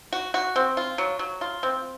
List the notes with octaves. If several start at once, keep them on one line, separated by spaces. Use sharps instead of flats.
F#4
F#4
C4
F4
F#3
F#3
F4
C4